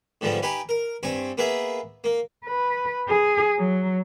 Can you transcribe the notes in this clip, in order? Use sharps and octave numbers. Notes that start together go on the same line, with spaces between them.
G#2 D3 F3 G3 B3
D#4 G4 B4 G#5 B5
A#4
G2 C4 G#5 C#6
A#3 B3 G#4 B4 E5
A#3
B4
G#4
F#3